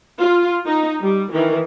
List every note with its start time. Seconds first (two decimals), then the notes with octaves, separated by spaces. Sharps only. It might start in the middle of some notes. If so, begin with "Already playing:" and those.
0.19 F4
0.66 D#4
1.01 G3
1.32 D#3 E3